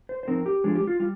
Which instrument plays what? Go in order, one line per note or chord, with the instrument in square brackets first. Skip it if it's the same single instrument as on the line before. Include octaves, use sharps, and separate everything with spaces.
[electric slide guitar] C5
C5
F3 C4 D#4 A#4
G4
F3 G#3 D4 F4 G#4
G4
F4
G3 F4